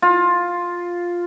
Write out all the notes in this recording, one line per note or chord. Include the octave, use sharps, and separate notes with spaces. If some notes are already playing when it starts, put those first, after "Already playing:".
F4